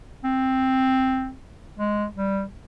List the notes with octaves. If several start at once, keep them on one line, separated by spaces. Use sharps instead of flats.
C4
G#3
G3